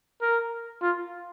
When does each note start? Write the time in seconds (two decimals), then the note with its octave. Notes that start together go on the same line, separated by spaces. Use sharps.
0.22 A#4
0.82 F4